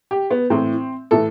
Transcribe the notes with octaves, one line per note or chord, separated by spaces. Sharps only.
G4
B3
A2 E3 C4
A2 E3 A4